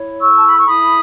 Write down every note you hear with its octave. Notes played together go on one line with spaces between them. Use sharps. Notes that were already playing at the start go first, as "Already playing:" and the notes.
Already playing: E4 C#5
A4 C#6 E6
A5
B5
C#6
E4 B5 D#6